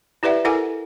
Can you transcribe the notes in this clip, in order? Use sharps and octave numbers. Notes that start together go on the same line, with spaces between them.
E4 G4 B4 D5 E5 F#5
E4 A4 A#4 F#5 G#5 D6